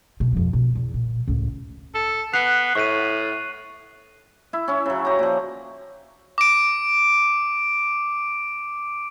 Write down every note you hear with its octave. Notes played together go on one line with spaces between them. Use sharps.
B2 A3
F2 F3
B2
E2
A#2
C#2 A2
A4
B3 F#6 C7 F7
A2 C#6 D#7
E4 E5
C#4 E4
C#3 F#3
G4 A#5
A#2 F3
D6 D7